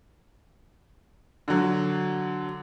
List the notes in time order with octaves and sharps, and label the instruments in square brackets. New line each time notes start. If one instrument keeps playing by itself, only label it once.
[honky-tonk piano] D3 F#3